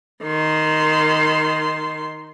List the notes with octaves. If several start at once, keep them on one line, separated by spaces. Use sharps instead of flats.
D#3 C6